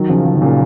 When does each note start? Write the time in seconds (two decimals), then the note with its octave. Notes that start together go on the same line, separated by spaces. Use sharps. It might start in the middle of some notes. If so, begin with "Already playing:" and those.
Already playing: D#3 F#3
0.09 C#3 F3
0.25 C#3 F3
0.35 D#3
0.42 A#2 C#3